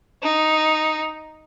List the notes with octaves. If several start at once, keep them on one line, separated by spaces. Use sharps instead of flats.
D#4